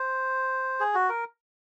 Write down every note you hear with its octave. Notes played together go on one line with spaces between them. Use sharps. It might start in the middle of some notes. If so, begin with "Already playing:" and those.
Already playing: C5
G#4
F#4
A#4